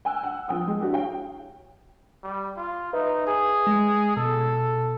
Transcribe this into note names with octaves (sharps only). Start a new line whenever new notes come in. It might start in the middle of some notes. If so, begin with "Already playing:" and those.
G5 G#5 E6 F#6
F#5
F3 G5 D#6
G#3
D4 E4 F#4 G4
C#5 F5 G5
G3
F4
D#4 B4 E5
G#4
G#3
B2 A4